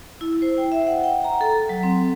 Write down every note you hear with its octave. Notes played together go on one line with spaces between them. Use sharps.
E4
C5
G5
E5
F#5
G5
A#5
A4
F#3
C4